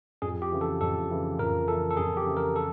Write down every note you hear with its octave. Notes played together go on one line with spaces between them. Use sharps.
F2 G#4
G4
C#3 E3
A4
F2 A4
C#3 E3
F2 A#4
C#3 E3 A4
A4
F2 G#4
G4
C#3 E3
A#4
A4